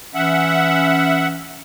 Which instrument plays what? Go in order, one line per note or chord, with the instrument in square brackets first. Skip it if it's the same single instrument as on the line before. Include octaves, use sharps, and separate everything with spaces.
[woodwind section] E3 C#4 [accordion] E5 F#5